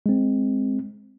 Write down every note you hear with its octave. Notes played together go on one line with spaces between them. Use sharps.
G#3 C4